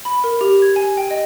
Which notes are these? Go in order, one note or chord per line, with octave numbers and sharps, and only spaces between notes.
B5
A#4
G4
G#6
G#5
G5
D#5